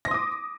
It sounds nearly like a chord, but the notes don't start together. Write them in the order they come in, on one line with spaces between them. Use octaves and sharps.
A#6 C6 D#6 D6